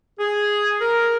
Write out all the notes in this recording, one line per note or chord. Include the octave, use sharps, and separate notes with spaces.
G#4
A#4